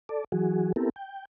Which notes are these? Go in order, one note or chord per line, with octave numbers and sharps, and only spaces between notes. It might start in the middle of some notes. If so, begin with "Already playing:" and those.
A4 D5
E3 F#3 F#4 G#4
B3 C4 E4 G4 A4 A#4
G5